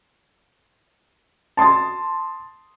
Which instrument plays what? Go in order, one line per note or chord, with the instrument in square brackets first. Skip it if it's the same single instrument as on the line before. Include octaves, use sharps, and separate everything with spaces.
[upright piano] A5 C6 D#6 A6